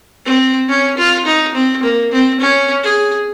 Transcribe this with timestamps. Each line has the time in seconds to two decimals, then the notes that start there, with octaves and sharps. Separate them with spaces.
0.25 C4
0.68 C#4
0.97 F4
1.26 D#4
1.54 C4
1.83 A#3
2.12 C4
2.40 C#4
2.83 G#4